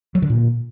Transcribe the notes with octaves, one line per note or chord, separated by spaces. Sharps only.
F#3
D3
A#2